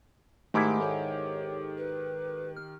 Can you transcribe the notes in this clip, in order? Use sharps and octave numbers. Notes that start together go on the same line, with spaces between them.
G#2 D#3 A3 E4 G4 D6
A4 C#5
B4
F6